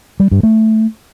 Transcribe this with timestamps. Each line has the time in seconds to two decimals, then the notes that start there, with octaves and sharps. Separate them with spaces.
0.20 G3
0.31 G2
0.43 A3